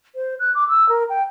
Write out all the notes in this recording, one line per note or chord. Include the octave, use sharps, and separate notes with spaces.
C5
F#6
D6
E6
A#4
G5